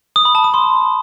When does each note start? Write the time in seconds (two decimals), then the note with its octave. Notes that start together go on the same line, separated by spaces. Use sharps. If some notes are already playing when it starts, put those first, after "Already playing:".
0.16 D#6
0.25 B5
0.35 A5
0.44 D#6
0.54 C6